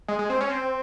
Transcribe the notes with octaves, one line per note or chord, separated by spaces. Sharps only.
G#3
G#3
C4
C#4
C4